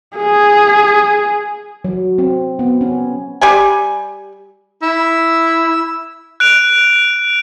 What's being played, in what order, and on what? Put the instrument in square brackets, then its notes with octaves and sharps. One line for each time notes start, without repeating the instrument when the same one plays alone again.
[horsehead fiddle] G#4
[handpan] F#3
C4
B3
C#4
[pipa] G3 G4 G#5
[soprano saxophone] E4 [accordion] E6
[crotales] F#6 D7 F7